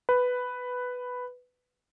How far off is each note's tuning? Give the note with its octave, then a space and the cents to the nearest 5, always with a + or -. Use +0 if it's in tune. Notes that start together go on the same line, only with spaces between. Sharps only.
B4 +5